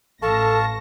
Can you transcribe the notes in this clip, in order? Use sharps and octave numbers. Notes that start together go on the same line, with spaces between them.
A1 A4 F5 A5 C#6 A#6